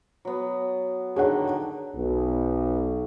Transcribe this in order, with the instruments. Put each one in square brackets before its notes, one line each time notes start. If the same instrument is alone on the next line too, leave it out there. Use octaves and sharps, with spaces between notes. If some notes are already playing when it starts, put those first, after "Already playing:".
[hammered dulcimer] F#3 B3
[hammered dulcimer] D3 D#3 [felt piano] G#4 C#5 F#5
[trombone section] B1